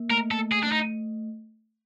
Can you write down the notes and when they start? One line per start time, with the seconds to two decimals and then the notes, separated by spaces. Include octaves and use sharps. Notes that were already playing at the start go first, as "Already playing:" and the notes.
Already playing: A#3
0.10 A3 A#4
0.31 A4
0.39 A3
0.52 G#4
0.63 A3 D4
0.72 D#4